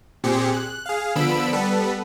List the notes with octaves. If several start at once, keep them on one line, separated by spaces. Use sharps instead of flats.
A#2 C4 G4 G#4 C#7
F#6
G#4 F5
D3 F3 B3 B5 E6 D7
G3 B3 A4 B4